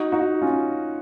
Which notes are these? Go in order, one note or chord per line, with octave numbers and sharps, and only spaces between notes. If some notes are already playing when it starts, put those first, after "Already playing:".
Already playing: D#4 F#4
D#4 F#4
C#4 F4